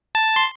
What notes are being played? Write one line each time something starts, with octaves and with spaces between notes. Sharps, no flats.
A5
C6